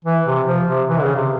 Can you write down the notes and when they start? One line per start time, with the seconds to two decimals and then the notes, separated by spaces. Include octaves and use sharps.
0.05 E3
0.26 C3
0.47 F3
0.68 C3
0.88 E3
1.02 C#3
1.16 C3